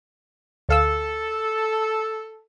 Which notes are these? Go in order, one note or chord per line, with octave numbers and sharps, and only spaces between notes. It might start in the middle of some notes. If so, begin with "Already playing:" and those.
D2 A4 F5 E6